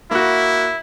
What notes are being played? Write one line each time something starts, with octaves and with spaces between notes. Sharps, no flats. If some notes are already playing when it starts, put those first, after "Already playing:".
A#3 E4 F#4